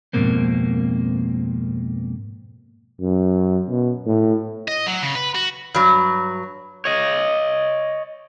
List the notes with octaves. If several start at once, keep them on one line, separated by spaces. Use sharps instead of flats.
F2 G#2 B2 A#3 C4
F#2
B2
A2
D#5
F#3
C#3
B4
F#4
G2 F#3
C#5 D#5